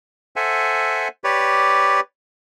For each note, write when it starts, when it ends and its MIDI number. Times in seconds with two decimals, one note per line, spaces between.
0.36 1.08 69
0.36 1.08 72
0.36 1.08 76
0.36 1.08 78
0.36 1.08 80
1.24 2.00 67
1.24 2.00 71
1.24 2.00 73
1.24 2.00 74